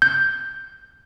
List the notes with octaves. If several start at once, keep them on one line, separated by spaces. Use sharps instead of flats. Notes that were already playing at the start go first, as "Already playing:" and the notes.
G6